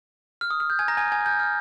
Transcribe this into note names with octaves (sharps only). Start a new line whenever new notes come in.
F6
D#6
F6
G6
G#5 G#6
A#5 A#6
G#5 G#6
G#5 G#6
G6
F6